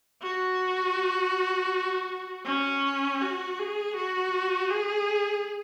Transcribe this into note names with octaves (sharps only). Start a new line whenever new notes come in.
F#4
C#4
F#4
G#4
F#4
G#4